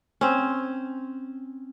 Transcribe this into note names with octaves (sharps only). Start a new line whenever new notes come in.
C4 C#4